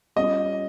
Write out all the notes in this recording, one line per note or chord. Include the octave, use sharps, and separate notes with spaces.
G3 C#4 F4 D#5